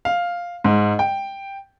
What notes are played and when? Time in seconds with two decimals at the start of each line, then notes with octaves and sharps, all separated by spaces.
0.05 F5
0.64 G#2
0.99 G5